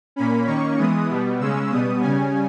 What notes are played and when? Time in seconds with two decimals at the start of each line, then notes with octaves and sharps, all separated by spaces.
0.16 A#2 A#3 C#4 B5
0.46 D#3 A#3 C#4 C#6
0.78 E3 G#3 B3 D#6
1.09 B2 G3 B3
1.39 C#3 G#3 C#4 E6
1.70 B2 G3 B3 D#6
2.01 C#3 G3 C#4 G#5